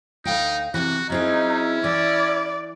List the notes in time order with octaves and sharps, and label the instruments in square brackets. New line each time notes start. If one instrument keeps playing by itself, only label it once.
[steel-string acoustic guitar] D2 F5 G5 [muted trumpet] D#4
[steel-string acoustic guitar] C3 E3 [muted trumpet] F#4
[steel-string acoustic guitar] F#3 C4 G#4 [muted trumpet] C#4 [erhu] D#4 [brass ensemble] E4
[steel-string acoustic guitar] E3 [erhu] D5